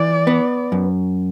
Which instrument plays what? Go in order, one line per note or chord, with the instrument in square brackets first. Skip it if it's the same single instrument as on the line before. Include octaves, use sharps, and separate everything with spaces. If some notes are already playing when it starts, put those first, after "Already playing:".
Already playing: [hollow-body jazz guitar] E3 [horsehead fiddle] D5
[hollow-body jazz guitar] B3
F#2